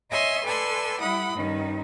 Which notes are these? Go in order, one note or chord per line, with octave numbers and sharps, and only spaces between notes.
C#5 D#5 E5 G#5 C6
A4 B4 D5 G#5 C6 E6
G3 E4 F#5 B5 D#6
G2 D#3 C#4 D#4